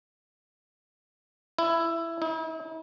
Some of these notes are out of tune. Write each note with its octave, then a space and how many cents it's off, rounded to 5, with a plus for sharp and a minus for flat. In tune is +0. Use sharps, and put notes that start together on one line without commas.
E4 +10
E4 -45